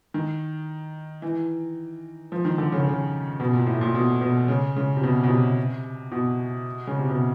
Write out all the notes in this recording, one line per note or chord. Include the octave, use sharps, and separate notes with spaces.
D#3
E3
F3
D#3
D3
C#3
D3
C#3
B2
A#2
A2
A#2
B2
B2
C#3
C#3
C3
B2
B2
C3
B2
C#3
C3
B2